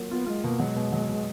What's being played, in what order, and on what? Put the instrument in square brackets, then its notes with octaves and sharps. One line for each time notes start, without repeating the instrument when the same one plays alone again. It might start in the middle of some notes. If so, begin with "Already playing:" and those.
Already playing: [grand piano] F#3 A#3 F4
[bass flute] B3 [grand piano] F4
[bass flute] G#3 [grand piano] F4
[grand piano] B2 [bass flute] A#3
[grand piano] F#3 [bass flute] G#3
[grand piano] B2
F#3
B2